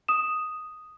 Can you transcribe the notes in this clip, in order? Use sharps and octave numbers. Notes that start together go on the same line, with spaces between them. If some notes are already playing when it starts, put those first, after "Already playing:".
D#6 E7